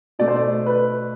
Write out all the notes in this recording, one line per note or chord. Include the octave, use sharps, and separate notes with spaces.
B2 A3 D5
C5
D5
B4